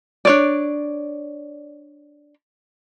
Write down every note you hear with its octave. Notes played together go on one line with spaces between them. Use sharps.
D4 C#5 D5